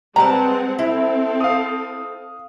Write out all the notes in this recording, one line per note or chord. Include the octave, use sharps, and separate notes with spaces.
G3 G#3 C4 B4 F#5 A5 A#5
C4 E4 A4
F5 D#6